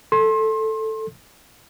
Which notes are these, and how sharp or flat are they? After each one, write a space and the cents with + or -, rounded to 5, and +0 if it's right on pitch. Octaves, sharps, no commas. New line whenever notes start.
A4 +0 C6 +30